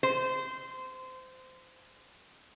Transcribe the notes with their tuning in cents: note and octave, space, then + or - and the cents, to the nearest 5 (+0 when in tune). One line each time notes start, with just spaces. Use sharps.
C5 -20